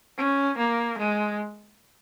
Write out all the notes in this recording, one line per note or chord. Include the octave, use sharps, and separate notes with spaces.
C#4
A#3
G#3